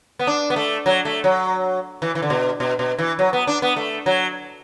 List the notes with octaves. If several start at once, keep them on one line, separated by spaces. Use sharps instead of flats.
B3
D4
B3
A3
F#3
A3
F#3
E3
E3
D3
B2
B2
B2
E3
F#3
B3
D4
B3
A3
F#3